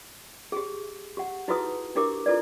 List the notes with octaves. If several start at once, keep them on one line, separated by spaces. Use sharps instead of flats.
G4 G#4
G4 F#5
D#4 E4 F#4 G#4 B4 D#6
D4 E4 G4 A#4 D6
E4 F4 A4 B4 D5